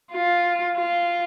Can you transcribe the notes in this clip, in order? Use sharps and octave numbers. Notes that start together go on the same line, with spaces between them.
F4
F4